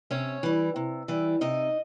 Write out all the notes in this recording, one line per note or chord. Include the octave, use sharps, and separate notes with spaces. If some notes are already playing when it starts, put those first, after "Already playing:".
C3 C#4 C#5
E3 G3
C3
E3 G3
C3 D#4 D#5